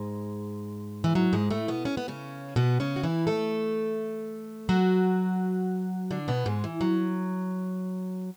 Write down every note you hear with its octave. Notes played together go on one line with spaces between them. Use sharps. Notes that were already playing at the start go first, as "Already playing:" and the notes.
Already playing: G#2 G#3
E3
F#3
G#2 G#3
A2 A3
B2 B3
C#4
B3
C#3 C#4
B2 B3
C#3 C#4
F#4
E3 E4
A3 A4
F#3 F#4
D3 D4
B2 B3
G#2 G#3
E3
F#3